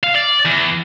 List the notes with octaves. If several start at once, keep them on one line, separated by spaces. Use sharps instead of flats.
F5
D5
E2